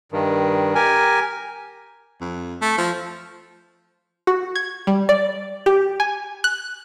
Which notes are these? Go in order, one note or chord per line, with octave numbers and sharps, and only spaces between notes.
G2 D#3
G4 A#4 G#5
F2
A3
F3
F#4
G#6
G3
D5
G4
G#5
F#6